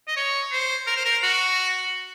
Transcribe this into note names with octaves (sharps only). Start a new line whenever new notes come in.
D#5
C#5
C5
A#4
C5
A#4
F#4